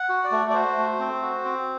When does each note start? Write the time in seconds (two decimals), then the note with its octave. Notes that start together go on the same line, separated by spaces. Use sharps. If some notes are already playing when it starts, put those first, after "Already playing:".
Already playing: F#5
0.09 F#4
0.24 D5
0.32 A3
0.50 D5
0.54 F#4 C5
0.77 A3
1.00 C4
1.22 F#4
1.45 C4